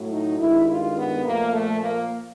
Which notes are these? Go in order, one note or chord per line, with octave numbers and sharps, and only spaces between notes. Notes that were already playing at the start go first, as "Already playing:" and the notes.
Already playing: A2 F#3 A3
D#4
G2 D#3 G#3 E4
F4
B3
A#2 F3 A3 A#3
A3
A#3